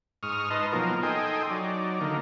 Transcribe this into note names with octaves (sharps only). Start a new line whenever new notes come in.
G#2 C#6 D#6 F6
D#4 B4 D#5 A5 C6
B2 F3 F#3 A#3 D#4 A#4
D#4 A4 D#5 G5 G#5 C6
F#3 D#4 D5
D3 D#3 A#3 D#4